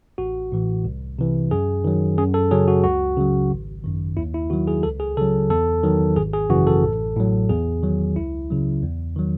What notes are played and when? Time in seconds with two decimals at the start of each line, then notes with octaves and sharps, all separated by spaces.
0.18 A1 F#4
0.52 A2 E3
0.85 C2
1.19 C3 E3
1.51 F#2 G#4
1.84 D#3 F#3
2.18 F#2 G#4
2.34 A4
2.51 C#3 F#3 G#4
2.68 F#4
2.84 C#2 F#4
3.17 C#3 F#3
3.51 G#1
3.84 F#2 D#3
4.17 D#2 E4
4.34 E4
4.50 D#3 F#3 F#4
4.67 G#4
4.83 C#2 A4
5.00 G#4
5.17 C#3 F#3 A4
5.50 E2 A4
5.83 D#3 F#3
6.16 G#1 G#4
6.34 G#4
6.50 F#2 C#3 E3 F#4
6.67 A4
6.84 A1
7.16 A2 F#3
7.50 E2 G#4
7.83 D#3 F#3
8.16 C#2 E4
8.50 C#3 F#3
8.83 E2
9.16 D#3 F#3